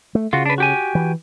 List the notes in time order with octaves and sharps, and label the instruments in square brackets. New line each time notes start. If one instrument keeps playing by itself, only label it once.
[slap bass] A3
[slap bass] C#3 [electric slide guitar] F4 F#4
[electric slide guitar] D4 B4
F#4 G4 G#5
[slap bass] E3